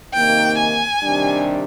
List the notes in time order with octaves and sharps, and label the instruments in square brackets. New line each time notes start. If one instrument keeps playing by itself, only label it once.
[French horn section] C3 D#3 A#3 D#4 [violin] G5
[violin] G#5
[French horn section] C3 D#3 G3 D4